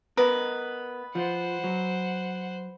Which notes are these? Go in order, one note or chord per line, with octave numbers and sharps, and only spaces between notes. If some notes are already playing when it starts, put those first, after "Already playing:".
B3 A#4 B4 D#5
F3 C5 F#5
F#3